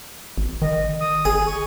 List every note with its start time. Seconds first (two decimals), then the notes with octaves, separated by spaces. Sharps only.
0.38 G#1
0.62 D#3 D#5
1.00 D#6
1.25 G1 G#4
1.46 C#6